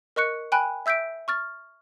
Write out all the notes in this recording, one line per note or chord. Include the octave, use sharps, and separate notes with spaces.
A#4 D#5 C#6 F#6 C#7
G5 G#5 B5 F#6
E5 E6 G6 B6 D7
C#6 F6 A6